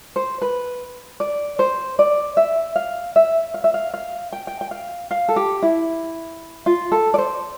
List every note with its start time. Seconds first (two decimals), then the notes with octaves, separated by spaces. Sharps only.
0.16 C5
0.42 B4
1.20 D5
1.59 C5
1.99 D5
2.37 E5
2.76 F5
3.16 E5
3.54 F5
3.64 E5
3.74 F5
3.94 F5
4.33 G5
4.47 G5
4.61 G5
4.71 F5
5.11 F5
5.29 A4
5.36 G4
5.63 E4
6.66 F4
6.92 A4
7.14 D5
7.18 C5